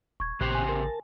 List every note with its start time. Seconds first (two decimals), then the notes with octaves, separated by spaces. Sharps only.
0.20 D#1 C#6 G#6
0.41 A1 A#2 C#3 G4 C5 F#6
0.55 G#5
0.68 A#4 A5